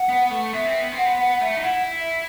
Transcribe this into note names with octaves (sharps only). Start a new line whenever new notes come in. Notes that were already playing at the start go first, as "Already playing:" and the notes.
Already playing: F#5
B3
A3
B3 E5
C4
B3
C4 F#5
B3
F#5
A3 E5
D#4
E4 F#5
E5